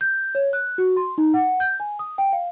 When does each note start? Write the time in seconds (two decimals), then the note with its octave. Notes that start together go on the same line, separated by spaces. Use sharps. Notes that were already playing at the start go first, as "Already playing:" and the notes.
0.01 G6
0.35 C#5
0.53 F#6
0.78 F#4
0.97 C6
1.18 D#4
1.34 F#5
1.60 G6
1.80 G#5
1.99 D#6
2.18 G5
2.33 F5